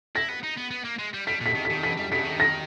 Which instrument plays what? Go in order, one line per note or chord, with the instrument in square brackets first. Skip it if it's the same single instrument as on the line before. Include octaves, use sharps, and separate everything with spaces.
[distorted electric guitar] E4 [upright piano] A#6
[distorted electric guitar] B3
D#4
B3
B3
A#3
G#3
G3
[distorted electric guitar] G3 [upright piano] B6
[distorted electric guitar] A#2
[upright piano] B6
[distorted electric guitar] D#3
[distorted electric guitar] D#3 [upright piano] B6
[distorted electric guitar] E3 [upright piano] B6
[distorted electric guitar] G3
[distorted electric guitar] C#3 [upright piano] B6
[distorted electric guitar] D#3
[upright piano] A#6